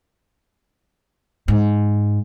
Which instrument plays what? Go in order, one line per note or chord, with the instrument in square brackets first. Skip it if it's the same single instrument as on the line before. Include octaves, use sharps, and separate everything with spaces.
[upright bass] G#2